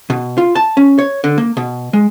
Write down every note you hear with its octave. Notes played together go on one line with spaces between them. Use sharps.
B2
F4
A5
C#4
C#5
D3
A#3
B2
G#3